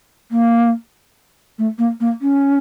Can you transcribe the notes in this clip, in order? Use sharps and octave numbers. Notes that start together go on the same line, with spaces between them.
A#3
A3
A#3
A#3
C#4